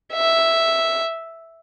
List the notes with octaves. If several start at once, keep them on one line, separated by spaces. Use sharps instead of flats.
E5